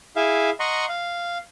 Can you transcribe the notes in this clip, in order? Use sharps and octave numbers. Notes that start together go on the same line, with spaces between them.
E4 G#4 E5 F5
D#5 F#5 A#5 C6 C#6
F5